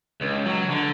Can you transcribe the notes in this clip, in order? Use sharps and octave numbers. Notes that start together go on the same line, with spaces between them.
C#2
F#3
D3